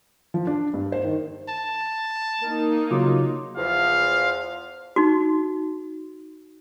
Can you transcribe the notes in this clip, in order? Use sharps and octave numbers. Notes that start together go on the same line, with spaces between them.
F3
D4
G2
C5
D#3
A5
A#3 D#4 A#4
C#3 F#3 F4 D6
E2 F3 F5
D#4 F#4